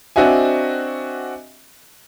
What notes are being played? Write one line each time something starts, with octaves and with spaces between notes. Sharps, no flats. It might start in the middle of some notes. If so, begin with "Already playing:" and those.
C4 D4 F#4 D#5 E5 G#5